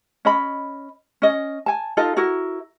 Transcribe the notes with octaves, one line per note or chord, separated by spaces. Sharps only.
C#4 D#5 B5
C#4 D#5
G#5 A5
D#4 F4 A4 D#5
E4 F#4 A#4